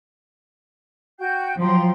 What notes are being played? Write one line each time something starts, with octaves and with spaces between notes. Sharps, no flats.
F#4 G5 G6
F3 F#3 G5 A#5 C6